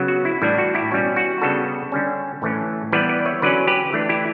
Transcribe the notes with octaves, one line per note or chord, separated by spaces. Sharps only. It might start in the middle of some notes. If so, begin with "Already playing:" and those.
Already playing: C#3 F#3 B3
F#4
E4
A2 E3 G3 D4 E4
F#4
E4 G4
B2 G3 C#4 F#4
F#4
C#3 G3 B3 D4 F#4 A4
D3 G3 C#4
A2 E3 A3 C#4
E3 G3 B3 B4 D5
B4 D5
C#5 E5
D3 F#3 C#4 B4 D5
G4 B4
E3 A3 D4
E4 G4